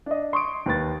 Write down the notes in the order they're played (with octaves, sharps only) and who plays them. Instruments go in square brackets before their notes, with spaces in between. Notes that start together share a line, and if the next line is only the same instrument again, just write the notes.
[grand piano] D4 D#5
C6 C#6 D#6 D7
D#2 B4 A6